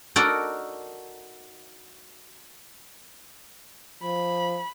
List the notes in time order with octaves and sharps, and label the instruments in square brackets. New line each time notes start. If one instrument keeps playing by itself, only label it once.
[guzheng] D#4 F#4 A4 A#4 D5
[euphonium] F3 [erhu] B5